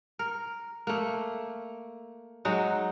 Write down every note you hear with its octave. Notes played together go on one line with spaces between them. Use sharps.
A#4
A3 A#3
F#3 G#3 D#4 F#4